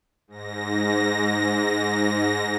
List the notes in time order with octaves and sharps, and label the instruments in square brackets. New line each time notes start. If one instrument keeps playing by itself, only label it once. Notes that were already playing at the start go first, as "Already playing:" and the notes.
[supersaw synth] G#2 A#6